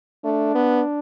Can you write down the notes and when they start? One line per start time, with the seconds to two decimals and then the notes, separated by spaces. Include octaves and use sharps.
0.24 A3 D4
0.55 B3